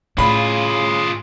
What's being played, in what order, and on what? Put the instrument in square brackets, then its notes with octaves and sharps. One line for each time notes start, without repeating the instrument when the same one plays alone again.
[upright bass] A2 [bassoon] C#3 [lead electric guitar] F4 G#4 [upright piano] B5